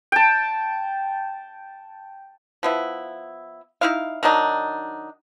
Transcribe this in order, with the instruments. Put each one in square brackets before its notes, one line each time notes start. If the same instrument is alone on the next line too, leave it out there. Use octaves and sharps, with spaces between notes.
[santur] G5 A5
[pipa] F3 B3 E4
D#4 E4 F5
D#3 F#3 D4 D#4